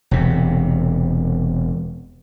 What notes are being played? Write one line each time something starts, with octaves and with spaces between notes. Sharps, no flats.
E1 C3